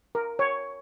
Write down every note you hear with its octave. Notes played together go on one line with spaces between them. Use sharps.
A#4
C#5